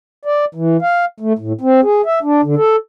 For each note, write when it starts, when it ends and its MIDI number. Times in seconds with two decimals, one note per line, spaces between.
0.25 0.45 74
0.55 0.77 52
0.82 1.05 77
1.20 1.33 57
1.39 1.53 45
1.61 1.81 60
1.83 2.02 68
2.06 2.19 76
2.22 2.41 62
2.43 2.55 50
2.56 2.76 69